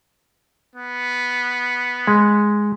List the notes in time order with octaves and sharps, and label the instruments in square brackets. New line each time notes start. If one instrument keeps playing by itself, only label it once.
[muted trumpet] B3
[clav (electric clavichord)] G#3